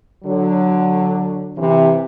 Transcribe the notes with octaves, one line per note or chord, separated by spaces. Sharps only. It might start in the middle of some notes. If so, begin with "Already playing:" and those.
D3 F#3
C3 E3